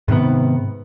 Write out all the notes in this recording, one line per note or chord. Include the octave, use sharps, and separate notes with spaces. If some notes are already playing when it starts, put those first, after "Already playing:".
G#2 C3 D#3 B3